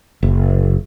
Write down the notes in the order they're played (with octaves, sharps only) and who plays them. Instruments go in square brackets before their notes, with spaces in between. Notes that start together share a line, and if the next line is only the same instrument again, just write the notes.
[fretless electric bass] F#1